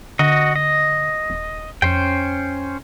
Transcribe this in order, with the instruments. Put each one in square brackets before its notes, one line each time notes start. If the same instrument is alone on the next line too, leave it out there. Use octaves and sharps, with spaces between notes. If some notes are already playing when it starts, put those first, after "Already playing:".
[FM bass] D3 [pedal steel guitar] F#4 D#5
[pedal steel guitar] D#5
[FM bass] D#1
[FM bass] F2 [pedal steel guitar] C#4 C5 G5